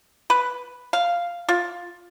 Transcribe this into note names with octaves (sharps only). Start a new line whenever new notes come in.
B4
F5
F4